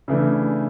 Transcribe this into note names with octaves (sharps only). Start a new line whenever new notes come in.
C#3 E3 A3 D4